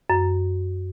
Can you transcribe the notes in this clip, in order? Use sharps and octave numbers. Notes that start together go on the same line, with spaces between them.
F#2